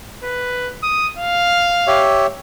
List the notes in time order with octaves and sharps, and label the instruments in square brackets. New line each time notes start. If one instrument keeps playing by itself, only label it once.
[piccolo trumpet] B4
D#6
F5
[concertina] G4 C#5 E5